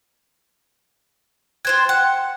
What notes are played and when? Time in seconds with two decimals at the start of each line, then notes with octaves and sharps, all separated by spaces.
1.65 F4 C5 G5 F#6 G#6
1.89 F#5 G5